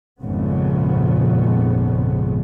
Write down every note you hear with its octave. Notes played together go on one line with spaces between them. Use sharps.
G#1 F2 A#2 C#3 B3